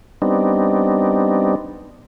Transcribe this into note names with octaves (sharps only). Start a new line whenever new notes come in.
G3 B3 C4 D4 D#4